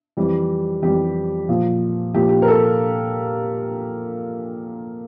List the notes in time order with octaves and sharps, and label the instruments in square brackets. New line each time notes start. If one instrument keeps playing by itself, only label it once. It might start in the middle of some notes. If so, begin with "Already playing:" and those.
[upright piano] F2 E3 G3
F2 E3 G3 G4
A#2 F3
A#2 F3 G4
G4
A#4
A4